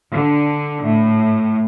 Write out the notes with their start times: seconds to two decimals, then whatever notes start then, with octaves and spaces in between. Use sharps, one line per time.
0.11 D3
0.82 A2